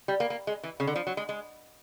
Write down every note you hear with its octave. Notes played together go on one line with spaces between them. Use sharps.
G3
A#3
A#3
G#3
E3
C#3
D3
F3
F#3
G#3
G#3